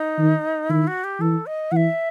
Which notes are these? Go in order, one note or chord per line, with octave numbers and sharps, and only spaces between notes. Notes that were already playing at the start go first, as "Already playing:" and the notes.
Already playing: D#4
D#3
D#3 E4
F#4
G4
E3 A4
D#5
E3 E5 F#5